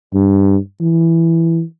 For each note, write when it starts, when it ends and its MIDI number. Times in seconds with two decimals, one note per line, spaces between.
0.14 0.56 43
0.81 1.62 52